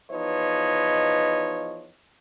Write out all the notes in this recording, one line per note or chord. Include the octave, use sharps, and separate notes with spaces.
E2 F3 D#4 B4 C#5 D#5